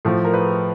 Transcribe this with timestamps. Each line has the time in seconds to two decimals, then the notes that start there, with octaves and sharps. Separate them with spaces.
0.05 A2 F3
0.25 A#4
0.33 B4